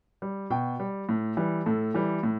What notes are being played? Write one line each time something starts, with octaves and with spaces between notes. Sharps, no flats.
G3
B2 G5
G3
A2
E3 G3
A2 A4
E3 G3
A2